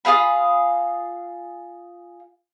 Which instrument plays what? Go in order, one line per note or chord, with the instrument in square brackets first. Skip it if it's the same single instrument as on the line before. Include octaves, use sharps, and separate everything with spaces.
[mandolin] F4 G#4 F5 B5